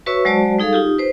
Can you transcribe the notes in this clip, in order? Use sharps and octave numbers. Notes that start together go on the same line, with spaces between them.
F#4 B4 C#5 E5 C#6 E6
F#3 G#3 F#4 C5 D5 A5
G3 D#4 G#4 A4 F5
D#4 F4 G4
B4 C5